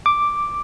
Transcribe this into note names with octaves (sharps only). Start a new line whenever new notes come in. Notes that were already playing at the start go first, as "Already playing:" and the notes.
D6